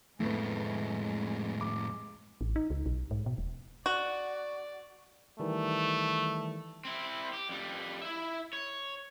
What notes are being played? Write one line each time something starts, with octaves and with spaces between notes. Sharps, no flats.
F2 A2 G#3 A3 B3
D6
A1
D#4
C#2
B1
G#2
B2
D#1
F#4 D5
D#3 E3 G3 A3
C4 E4
G4
F2 G3
E4 E5
C#5